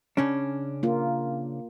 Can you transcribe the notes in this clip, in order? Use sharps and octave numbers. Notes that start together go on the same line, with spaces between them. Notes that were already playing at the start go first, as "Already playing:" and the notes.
C#3 C#4 D4
A#3 F4